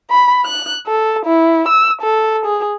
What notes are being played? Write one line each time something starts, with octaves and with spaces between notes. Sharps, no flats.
B5
F#6
A4
E4
E6
A4
G#4